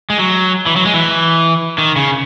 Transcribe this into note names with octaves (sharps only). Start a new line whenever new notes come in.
G#3
F#3
E3
F#3
G#3
E3
D#3
C#3